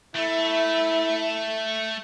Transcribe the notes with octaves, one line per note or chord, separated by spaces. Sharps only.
A3 E4